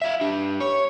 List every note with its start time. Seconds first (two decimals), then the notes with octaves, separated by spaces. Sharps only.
0.02 F4 E5
0.21 D4 G4
0.60 C#5